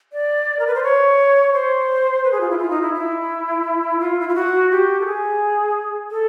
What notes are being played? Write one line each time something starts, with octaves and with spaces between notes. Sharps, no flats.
D5
A#4
B4
C5
C#5
C5
B4
G#4
F4
E4
F4
D#4
E4
E4
F4
E4
F4
F#4
G4
A4
G#4
A4